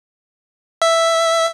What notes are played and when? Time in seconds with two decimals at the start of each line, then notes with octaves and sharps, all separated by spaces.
0.82 E5